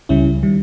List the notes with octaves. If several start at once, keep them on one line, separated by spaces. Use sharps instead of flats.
C#2 C#3 G3 C#4 E4
D#3 G3